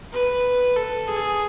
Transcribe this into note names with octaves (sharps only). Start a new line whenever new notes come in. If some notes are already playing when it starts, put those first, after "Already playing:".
B4
A4
G#4